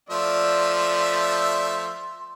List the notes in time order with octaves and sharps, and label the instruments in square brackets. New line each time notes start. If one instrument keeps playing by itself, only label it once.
[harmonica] F3 A3 E5 [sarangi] D5 [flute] C6